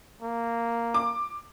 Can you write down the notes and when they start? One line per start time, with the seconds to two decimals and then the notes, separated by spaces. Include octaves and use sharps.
0.22 A#3
0.94 D6